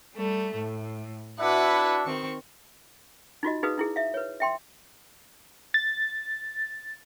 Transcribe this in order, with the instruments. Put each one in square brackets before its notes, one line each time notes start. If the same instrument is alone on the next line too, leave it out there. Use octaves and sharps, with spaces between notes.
[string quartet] G3 A3
A2
[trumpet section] D4 E4 E5 [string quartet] F#4 B4 F#5
[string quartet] D#3 C4 C#6
[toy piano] D#4 F4 F#4 D#5
D#4 F#4 G#4 B4 F5 D#6
D#4 E4 G#4
E5 F5
B4 C#5
E5 G5 C6
[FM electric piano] A6